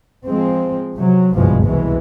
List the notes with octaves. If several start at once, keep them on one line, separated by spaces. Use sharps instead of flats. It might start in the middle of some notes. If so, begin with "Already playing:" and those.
F3 G#3 C4
C3 F#3
F#1 C2 G2 B2 F3 G#3
C2 F#2 B2 E3 G#3